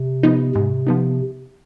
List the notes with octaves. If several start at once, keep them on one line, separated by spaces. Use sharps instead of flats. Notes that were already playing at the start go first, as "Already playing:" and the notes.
Already playing: C3
F3 B3 D#4
G#2 C3
F3 B3 D#4